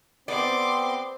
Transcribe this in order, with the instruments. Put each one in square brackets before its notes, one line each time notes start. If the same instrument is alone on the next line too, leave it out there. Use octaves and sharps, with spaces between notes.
[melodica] B3 G4 [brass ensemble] C4 [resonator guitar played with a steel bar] D5 [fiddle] C6 D6